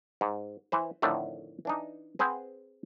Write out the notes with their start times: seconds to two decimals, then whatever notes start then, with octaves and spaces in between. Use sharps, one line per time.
0.21 G#2
0.72 E3 B4 C5
1.02 F2 A2 D3 D#3 A3
1.65 E3 D4 D#4
2.19 C4 G#4 B4 C5 F#5